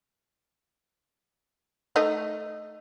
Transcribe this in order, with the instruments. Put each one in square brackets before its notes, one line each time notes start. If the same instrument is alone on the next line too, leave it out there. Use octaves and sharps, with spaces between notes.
[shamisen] A3 D#4 D#5